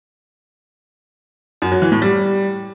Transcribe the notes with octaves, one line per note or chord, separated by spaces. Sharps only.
F#2
F#3
E3
A2
G3